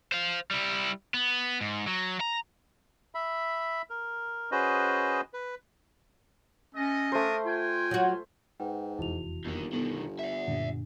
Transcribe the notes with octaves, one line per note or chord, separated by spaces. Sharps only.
C5 F5
G3 E4
B3
G#2
F#3
A#5
E5 B5
A#4
C#4 F#4 G#4 B4 C5 D#5
B4
A3 C#4 D#5
A3 D4 A#4 C5 D#6
F4 G5 G#5
F#3 F#4
G#2 B4 F#5 G5
F1 E2 E4 F#4 F7
G1 D#2 D#3
B2 D#3 B3 A4
E5 F#5
F#2 A#2 D3 D4